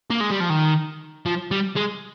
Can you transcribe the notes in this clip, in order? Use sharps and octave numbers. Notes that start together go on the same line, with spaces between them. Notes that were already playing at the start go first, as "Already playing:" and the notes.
A#3
G#3
G3
F3
D#3
F3
G3
G#3